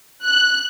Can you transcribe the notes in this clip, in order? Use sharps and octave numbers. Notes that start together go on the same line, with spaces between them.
F#6